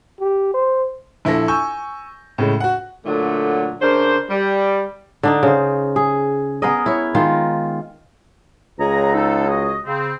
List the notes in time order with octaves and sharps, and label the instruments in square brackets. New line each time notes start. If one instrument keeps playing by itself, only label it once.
[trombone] G4
C5
[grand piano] A#1 E4 A4 A#6
G#5 C#6 E6 G6
A2 C#3 G#3
F#4 F#5
[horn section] A#2 D3 F#3 A3
C#3 D4 A#4 C5
G3
[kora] D3 D4 D#4
C#3 C5
G#4
B3 G#4 A#4 D#5
E4 C#5
D#3 G#3 F4
[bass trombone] C#2 [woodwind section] G#4 C#5 A#5
[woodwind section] D#4 A4
F#4 G#4 D#5
C#3 C4